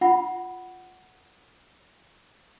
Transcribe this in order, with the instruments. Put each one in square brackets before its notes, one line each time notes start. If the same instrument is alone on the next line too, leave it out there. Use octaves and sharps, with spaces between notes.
[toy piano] F4 F#5 B5